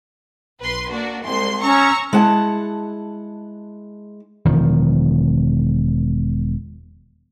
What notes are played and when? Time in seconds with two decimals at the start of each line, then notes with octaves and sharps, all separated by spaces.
0.59 B1 B4 C6
0.91 A#3 D4 F#4
1.26 C2 G#3 C6
1.63 C#4 A#5 C#6 E6
2.13 G#3 E4 F#5 A5
4.45 E1 D#3 F3